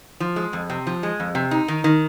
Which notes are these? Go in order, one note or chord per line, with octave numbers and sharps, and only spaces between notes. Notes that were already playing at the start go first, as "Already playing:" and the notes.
F3
G#3
F2
C3
F3
G#3
F2
C3
D#4
D#3
D#3